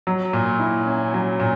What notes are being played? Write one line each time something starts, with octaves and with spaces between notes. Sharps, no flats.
F#3
A#2
E4
C#4
F#3
A#2